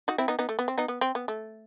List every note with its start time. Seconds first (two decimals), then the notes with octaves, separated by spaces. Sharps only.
0.08 D#4 F#4
0.18 C4 E4
0.28 B3 D#4
0.39 B3 D#4
0.49 A3
0.59 B3
0.68 C4
0.78 B3 D#4
0.88 B3
1.01 C4
1.15 B3
1.28 A3